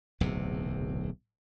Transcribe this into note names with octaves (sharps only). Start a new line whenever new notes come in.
D1 B1 E2 C3